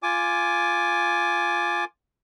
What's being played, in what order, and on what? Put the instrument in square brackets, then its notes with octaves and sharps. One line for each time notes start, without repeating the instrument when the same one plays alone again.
[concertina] F4 G#5 D6